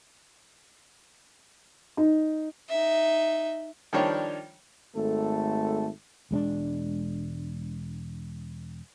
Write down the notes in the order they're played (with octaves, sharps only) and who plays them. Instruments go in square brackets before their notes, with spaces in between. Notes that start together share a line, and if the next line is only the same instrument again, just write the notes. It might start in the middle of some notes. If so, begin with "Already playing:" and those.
[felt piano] D#4
[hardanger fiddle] D#4 E5
[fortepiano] D#3 F3 G3 D4 C#5
[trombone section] G#1 A3 A4
[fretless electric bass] E1 G#3 C#4 D4